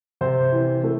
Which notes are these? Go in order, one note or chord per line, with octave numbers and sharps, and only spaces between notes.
C3 C5
E3
A3